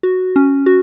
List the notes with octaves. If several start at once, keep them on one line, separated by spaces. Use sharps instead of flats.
F#4
C#4
F#4